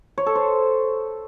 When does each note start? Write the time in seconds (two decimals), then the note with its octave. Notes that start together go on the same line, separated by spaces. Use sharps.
0.18 C#5
0.26 A4
0.35 C5